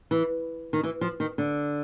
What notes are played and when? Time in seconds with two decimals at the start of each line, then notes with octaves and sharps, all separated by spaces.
0.11 E3
0.73 D#3
0.83 E3
1.01 F3
1.20 D#3
1.38 D3